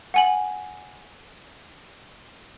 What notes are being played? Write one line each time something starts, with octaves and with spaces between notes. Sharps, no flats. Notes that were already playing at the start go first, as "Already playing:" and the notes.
F#5 G#5 F#7